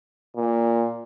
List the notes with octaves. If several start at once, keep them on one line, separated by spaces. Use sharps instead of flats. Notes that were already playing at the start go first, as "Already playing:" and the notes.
A#2